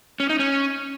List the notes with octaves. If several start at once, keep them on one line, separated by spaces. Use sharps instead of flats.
C#4
D#4
C#4